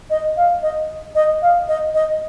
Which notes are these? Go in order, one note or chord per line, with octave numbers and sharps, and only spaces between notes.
D#5
F5
D#5
D#5
F5
D#5
D#5